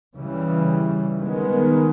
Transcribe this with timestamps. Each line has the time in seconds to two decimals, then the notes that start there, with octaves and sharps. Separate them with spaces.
0.16 C#3 E3 G3
1.20 D#3 G#3 B3